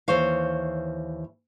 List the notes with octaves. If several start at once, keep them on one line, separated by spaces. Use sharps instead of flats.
D#2 E3 C5 C#5 F5